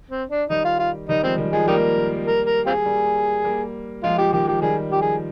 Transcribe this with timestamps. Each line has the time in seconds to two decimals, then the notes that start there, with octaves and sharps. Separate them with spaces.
0.10 C4
0.30 D4
0.50 D#3 G3 D#4
0.65 F4
0.79 F4
1.09 D#3 G3 D#4
1.23 F3 G#3 C4
1.38 D#3 G3
1.53 F3 G#3 G#4
1.68 G3 A#3 D#4 G4 A#4
2.27 A#4
2.46 A#4
2.66 C4 F4 G#4
2.85 G3 A#3
3.44 G3 A#3
4.04 F3 G#3 F4
4.18 F3 G4
4.33 D#3 G4
4.47 F3 G4
4.62 D#3 G3 G#4
4.91 F3 G4
5.01 G#4